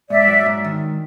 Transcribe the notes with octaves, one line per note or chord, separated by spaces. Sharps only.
G#2 D5 E5
F#3
G#2
D#3